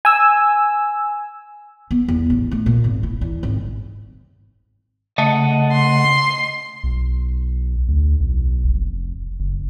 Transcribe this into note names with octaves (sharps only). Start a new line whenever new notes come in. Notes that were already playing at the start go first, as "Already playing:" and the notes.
G#5 E6
B3
E2
A1
A3
A#2
G#1
E4
E2
G#1
C#3 A3 D#5 F#5 A5
C6
B1
D2
B1
F1
F#1